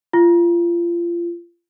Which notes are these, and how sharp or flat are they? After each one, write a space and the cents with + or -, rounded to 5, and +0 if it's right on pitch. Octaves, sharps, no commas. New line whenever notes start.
F4 -30